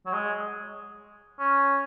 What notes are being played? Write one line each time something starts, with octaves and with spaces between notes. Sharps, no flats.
F#3
G#3
C#4